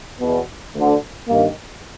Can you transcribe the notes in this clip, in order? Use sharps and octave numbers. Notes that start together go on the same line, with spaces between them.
E2 B2
D2 D3
G2 D#3 A#3